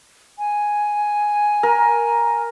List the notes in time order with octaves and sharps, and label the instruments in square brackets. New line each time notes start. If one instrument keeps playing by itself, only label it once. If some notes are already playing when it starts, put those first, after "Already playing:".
[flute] G#5
[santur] A#4